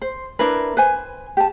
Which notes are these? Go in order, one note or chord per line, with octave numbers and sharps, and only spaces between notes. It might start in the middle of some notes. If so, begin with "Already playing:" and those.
C5
D4 E4 A#4 B4
B4 C5 G#5
G4 A5